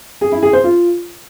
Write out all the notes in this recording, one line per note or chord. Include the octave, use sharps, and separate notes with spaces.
G#4
E4
G#4
C5
F4